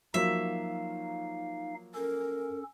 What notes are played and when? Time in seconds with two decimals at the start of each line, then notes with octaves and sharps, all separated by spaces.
0.14 F3 F#3 A#3 D#4 E5 F5
1.95 C#4 A4 A#4